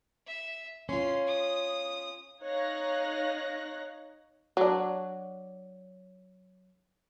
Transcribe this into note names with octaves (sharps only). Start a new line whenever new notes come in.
E5
C#4 F4 C6
D#6
D#4 C#5 F5 F#6 A#6
F#3 D4